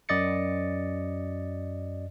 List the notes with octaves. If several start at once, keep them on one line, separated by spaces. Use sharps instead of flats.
F#2 D5 D#5 A6 C#7